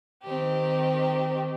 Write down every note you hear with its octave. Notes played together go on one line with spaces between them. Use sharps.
D#3 C4 G4